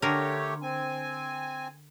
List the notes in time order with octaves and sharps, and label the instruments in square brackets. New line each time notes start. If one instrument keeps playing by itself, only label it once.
[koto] D3 A#4 [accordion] A3 G4 C#5
[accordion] C4 G#5